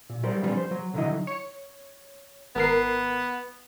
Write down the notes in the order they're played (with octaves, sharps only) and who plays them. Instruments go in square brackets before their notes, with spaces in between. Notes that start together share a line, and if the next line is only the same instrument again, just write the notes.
[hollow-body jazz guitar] A#2
F#3 G3 A#4 C5
D3 F3 G3 B3 C#4
C5
F#3
C2 D3 D#3 F#3 E4 D#5
[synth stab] C#5
[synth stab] G#1 A#4 C7 [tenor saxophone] B3